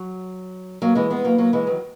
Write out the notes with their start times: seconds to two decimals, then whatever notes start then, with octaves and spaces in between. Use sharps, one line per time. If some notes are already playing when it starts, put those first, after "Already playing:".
Already playing: F#3
0.82 F#3 A#3
0.95 E3 G#3
1.10 G#3 B3
1.24 F#3 A#3
1.38 F#3 A#3
1.53 E3 G#3
1.67 D#3 F#3